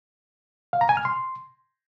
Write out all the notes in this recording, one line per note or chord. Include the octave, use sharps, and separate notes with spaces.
F5
A#5
G#5
F6
C6